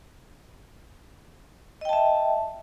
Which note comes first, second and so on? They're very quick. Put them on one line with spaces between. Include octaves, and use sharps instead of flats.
D#5 G5 A5 E5